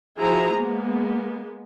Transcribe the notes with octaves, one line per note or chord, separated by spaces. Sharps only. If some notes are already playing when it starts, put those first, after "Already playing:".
F3 E4 F#4 G#4 C5 A#5
G#3 A#3 B3